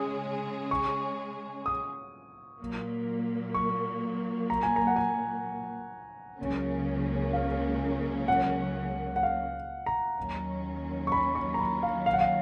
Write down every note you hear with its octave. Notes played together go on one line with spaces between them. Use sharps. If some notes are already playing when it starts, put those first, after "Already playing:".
Already playing: C#3 G#3 C#4 G#4 D#6
C#6
D#6
A#2 F#3 A#3
C#6
A#5
G#5
A#5
F#5
G#5
C#2 C#3 F#3 A#3 C#4
F5
F#5
F#5
F5
A#5
D#2 D#3 F#3 C#4
C#6
B5
C#6
A#5
B5
F5
F5
F#5
F5